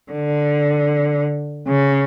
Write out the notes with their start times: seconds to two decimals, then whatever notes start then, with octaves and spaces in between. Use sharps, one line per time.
0.12 D3
1.68 C#3